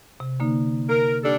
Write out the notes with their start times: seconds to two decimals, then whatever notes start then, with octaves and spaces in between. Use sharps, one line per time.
0.20 C3
0.40 D3 A#3 D#4
0.89 A#4
1.23 G3 D4 A4